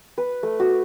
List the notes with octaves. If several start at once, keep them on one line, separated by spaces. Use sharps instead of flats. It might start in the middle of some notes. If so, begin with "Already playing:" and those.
B4
A3
F#4